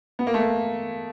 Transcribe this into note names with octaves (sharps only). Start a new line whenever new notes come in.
B3
A#3
A3
A#3